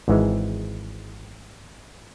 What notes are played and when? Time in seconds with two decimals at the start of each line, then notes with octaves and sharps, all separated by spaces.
0.08 G#1 G#2 E3 G#3